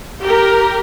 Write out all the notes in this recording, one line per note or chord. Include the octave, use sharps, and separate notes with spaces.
G4 A#4